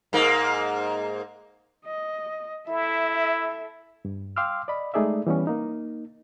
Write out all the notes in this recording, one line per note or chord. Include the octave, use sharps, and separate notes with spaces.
G#2 A#3
D#5
E4 A4 E5
G2
F5 G5 C6 D6 E6 F6
D5 D#5 B5
G#3 A3 D#4 G#4 D5 E5
E3 G3 B3 C#4
A#3 D#4